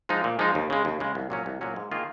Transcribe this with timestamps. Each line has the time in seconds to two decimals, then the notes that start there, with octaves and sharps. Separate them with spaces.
0.09 F3 G#3 D#4
0.24 A#2
0.39 F3 G#3 D#4
0.55 D#2
0.70 C#3 G#3
0.85 D#2
1.00 C#3 G#3
1.15 C2
1.30 A#2 F#3 C#4
1.46 C2
1.61 A#2 F#3 C#4
1.76 G#2
1.91 D#3 A#3 F4 G#4